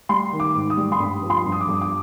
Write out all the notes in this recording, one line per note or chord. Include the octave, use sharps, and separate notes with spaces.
G3 C6
D#3
D6
G#2
D#6
G3
C6
G2 B5
F3
C6
G2
D#6
D6
G2
D6